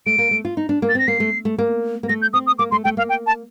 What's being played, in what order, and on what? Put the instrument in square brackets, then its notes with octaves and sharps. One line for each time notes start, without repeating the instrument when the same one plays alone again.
[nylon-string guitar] A3 [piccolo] D7
[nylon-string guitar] A#3
A3
F4
D#4
D4
A#3
[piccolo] A6
[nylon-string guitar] C4
[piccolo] A#6
[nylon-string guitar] A#3 [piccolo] C7
[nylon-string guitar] A3
A3
A#3
A#3
[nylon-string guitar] A3 [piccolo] A#6
[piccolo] G6
[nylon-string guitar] C4 [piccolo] D#6
[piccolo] D#6
[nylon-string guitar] A#3 [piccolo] D6
[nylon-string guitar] A3 [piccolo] C6
[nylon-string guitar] A3 [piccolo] G5
[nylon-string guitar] A#3 [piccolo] F5
[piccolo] G5
A5